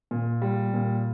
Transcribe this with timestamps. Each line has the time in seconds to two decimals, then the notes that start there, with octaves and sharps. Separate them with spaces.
0.11 A#2
0.42 G3
0.74 A#2